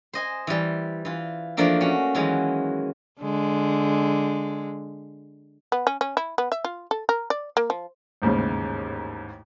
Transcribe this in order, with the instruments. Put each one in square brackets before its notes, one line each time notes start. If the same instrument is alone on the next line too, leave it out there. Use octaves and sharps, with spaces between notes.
[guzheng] C5 D#5 G#5
E3 G3
E3 F4
E3 F3 A3 A#3 D4 D#4
C#4 F#4
D#3 E3 F#3 G#3
[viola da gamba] D3 G#3
[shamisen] B3
C#4
C#4
E4
B3
E5
F4
A4
A#4
D5
A#3
F3
[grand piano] A1 D#2 G#2 C#3